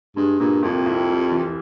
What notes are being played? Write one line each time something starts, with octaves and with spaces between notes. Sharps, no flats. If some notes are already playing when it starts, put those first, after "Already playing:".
G2 G#3
G2 A#2
C2 F2
C2
G3
E3